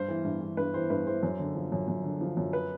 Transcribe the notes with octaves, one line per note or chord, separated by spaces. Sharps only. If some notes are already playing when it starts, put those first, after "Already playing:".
Already playing: G2 C5
E3
G2
E3
G2 B4
E3 C5
G2 B4
E3 C5
F#2
D3
F3
F#2
F#2
D3
F3
F#2
B4